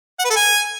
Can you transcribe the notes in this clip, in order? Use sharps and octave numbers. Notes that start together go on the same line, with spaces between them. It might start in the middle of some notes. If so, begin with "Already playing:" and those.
F#5
B4
A4
G#5